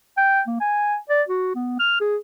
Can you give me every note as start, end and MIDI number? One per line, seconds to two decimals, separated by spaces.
0.17 0.41 79
0.47 0.56 58
0.61 0.97 80
1.10 1.22 74
1.29 1.54 66
1.55 1.76 59
1.80 1.96 89
2.01 2.17 68